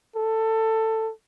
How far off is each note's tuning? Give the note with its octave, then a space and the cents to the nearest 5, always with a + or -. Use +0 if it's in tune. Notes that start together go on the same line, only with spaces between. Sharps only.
A4 +15